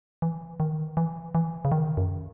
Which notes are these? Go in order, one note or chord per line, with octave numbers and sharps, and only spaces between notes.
E3
D#3
E3
E3
C#3
D#3
F#2